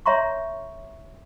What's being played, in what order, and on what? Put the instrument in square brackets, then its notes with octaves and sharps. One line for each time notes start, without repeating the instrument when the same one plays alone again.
[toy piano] C#5 E5 A#5 C6 C#6